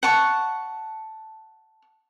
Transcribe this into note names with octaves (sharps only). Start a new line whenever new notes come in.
F#5 A5 C#6